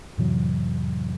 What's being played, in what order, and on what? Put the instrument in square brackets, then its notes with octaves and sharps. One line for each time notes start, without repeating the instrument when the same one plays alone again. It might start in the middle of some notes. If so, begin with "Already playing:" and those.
[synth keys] F2 A2 C3 E3 F#3